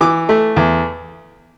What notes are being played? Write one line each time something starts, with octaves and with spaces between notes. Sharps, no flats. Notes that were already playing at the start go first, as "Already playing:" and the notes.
E3 D6
A3
E2